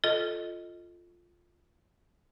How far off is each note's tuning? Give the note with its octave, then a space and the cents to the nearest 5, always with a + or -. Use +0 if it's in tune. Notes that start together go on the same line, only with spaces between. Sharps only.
F4 +0 A4 -5 D#5 +0